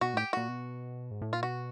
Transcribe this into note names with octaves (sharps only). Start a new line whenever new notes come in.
B2 F#4
A2 G4
A#2 F#4
B2
G#2
A2
A#2 F4
B2 F#4